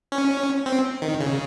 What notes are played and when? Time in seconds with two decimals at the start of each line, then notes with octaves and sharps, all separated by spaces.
0.12 C#4
0.66 C4
1.02 D#3
1.20 C#3